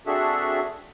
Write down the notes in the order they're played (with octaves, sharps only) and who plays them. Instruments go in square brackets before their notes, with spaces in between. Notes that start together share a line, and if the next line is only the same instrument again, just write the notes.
[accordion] C4 D4 F#4 G#4 A4 E5